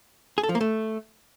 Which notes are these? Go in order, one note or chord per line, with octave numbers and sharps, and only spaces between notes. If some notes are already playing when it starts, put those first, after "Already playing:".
G#4
A4
F3
A#3
A3